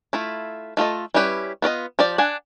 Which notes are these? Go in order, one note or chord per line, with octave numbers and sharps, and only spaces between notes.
A3 E4 F4
A3 F4 A4 D#5
G3 C#4 E4 G4 B4
B3 F4 D5 D#5
F3 G4 D5
D4 F#5 G#5